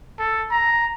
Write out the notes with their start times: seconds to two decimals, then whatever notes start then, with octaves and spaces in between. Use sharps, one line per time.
0.19 A4
0.51 A#5